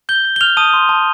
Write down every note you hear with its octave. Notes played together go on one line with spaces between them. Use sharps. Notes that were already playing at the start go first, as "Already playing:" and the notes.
G6 G7
G6
G7
F6 G6 F7
A5 D#6 D#7
C6
A5